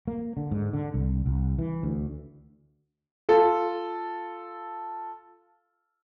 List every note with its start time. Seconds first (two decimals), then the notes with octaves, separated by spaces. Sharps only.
0.08 A#3
0.37 D3
0.51 G#2
0.73 D3
0.94 C2
1.26 C2
1.59 E3
1.83 D2
3.29 F4 A4